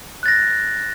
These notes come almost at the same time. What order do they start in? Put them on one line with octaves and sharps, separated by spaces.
F#6 A6 A#6